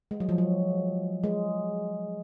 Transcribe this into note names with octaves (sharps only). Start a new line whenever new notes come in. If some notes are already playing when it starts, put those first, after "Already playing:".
G#3
F#3
F3
F#3
G#3